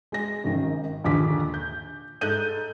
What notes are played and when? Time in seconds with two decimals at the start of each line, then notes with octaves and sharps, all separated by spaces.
0.12 G#3 A#6
0.44 G#1 F#2 D#3
1.04 A#1 D#2 D3 D6 B6
1.54 G6
2.21 G#2 A4 F#6 G6 D#7